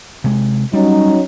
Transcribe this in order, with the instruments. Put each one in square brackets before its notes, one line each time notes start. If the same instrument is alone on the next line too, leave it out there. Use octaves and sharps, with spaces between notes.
[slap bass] C3 G#3
[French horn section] F#3 C#4 D#4 [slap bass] G3